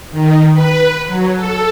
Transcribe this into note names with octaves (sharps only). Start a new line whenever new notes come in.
D#3
B4
F#3
A4